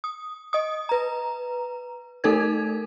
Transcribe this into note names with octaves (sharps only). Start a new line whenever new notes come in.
D#6
D#5 D#6
B4 A#5
A3 D#4 A4 A#4 G#6